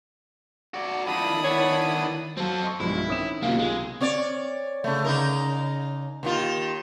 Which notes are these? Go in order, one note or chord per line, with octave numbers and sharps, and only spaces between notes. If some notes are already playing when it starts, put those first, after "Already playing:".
F#4 D5 A5 A#5
F2 D#3 D4 E4 B5 D#6
B3 D4 C#5
F#3 C4 A4
D#5 C6 C#6
B1 G2 F3 G#3 E4
D#3 C4 C#4 D#6 E7
B1 C3 A#3 C#4 F4 F5
G#3
C4 C#5 D5
C#3 A3
C#3 D#4 A#4
D#2 D#3 F4